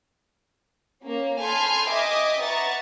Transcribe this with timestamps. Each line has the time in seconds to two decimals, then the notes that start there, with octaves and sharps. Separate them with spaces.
1.03 A#3 C#4
1.40 A4 G#5 B5 C6 F6 G6
1.89 D#5 E5 G5 G#5 D6 D#6
2.42 B4 E5 F#5 A#5 C#6 A6